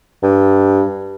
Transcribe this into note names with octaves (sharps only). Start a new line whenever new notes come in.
G2